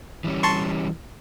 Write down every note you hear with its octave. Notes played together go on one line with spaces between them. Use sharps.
E3 G3 C#4
A5 C6 C#6